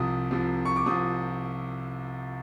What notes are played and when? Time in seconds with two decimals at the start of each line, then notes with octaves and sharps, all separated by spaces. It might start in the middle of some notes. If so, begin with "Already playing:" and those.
Already playing: C2 C3 F3 D#6
0.31 C2 C3 F3
0.65 C#6
0.76 D6
0.86 C2 C3 F3 D#6